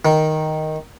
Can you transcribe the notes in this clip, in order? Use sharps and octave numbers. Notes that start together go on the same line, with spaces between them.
D#3